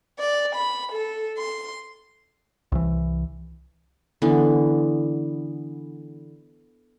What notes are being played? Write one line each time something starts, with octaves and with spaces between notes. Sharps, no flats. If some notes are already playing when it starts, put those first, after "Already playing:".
D5
B5
A4
C6
C2 E3
D3 E3 B3